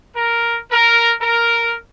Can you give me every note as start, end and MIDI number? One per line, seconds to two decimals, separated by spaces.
0.15 0.56 70
0.70 1.12 70
1.20 1.73 70